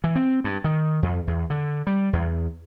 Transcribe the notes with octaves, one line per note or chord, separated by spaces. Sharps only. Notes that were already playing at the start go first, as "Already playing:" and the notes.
E3
C4
G2
D#3
F2
E2
D3
G3
E2